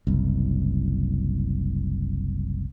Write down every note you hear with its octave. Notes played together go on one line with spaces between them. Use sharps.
F#1 C2